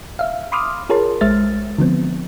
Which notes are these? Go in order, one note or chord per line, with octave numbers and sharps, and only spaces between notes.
E5 F5
B5 C6 D6 D#6 F6
F4 G#4 A#4 C#5 A5 C6
A#1 G#3 C5 E5 F6 A6
D3 F3 B3 C4